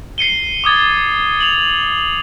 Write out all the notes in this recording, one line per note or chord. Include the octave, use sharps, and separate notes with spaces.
C7 C#7 D#7 G7
D6 D#6 G#6 A6
F7 F#7